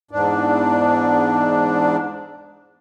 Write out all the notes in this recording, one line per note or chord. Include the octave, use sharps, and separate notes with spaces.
E2 G#2 D4